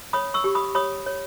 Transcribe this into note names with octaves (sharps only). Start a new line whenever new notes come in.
C#5 B5 D#6
C#6 E6
G4
B5 D#6
C#5 B5 D#6
C#5